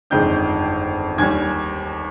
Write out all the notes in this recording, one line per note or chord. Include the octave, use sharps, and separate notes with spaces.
G1 F2 D#3 G#3 D4 G5 G6
D#2 D#3 G3 G#5 G#6